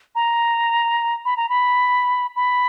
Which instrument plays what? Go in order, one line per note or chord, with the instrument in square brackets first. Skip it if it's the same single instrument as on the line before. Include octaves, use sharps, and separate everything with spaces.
[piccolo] A#5
B5
A#5
B5
B5